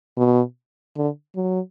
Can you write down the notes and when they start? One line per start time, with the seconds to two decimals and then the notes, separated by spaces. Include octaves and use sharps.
0.17 B2
0.96 D3
1.36 F#3